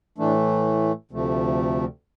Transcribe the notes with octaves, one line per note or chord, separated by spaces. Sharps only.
A2 E3 A3 D4
D2 C3 F3 A3